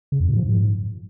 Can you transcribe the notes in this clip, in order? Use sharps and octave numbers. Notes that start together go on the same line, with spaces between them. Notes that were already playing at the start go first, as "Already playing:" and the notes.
C#3
F2
A2
F3
G#2